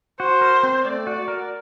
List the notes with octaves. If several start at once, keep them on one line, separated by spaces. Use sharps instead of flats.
F#4 C5
A#4
C4
A3 D5
F#4
A#4